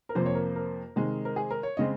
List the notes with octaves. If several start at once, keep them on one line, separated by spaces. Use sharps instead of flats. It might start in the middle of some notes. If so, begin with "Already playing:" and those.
A#4
F2 C3 F3 A#3 C5
C#5
A#4
A#4
C3 D#3 G#3
A#4
G#4
A#4
C#5
C#3 G#3 C4 D#5